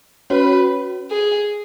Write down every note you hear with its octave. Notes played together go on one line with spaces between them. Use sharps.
C#4 F#4 B4 C#5
G#4